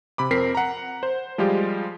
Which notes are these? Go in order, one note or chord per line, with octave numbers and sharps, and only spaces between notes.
C3 B5 D6
F2 C4 A#4 B6 C7
F#5 A#5
C5
F3 G3 G#3 F4 G4